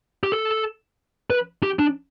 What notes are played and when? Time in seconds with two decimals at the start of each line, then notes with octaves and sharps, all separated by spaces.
0.23 G4
0.32 A4
1.30 B4
1.63 G4
1.79 D4